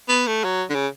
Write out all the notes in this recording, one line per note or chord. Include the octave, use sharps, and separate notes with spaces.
B3
A3
F#3
D3
C#3